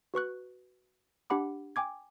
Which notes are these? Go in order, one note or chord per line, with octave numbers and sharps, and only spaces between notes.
F#4 B4 C#6 F#6
D4 G4 F#5 B5 D6
G5 G#5 D6 G#6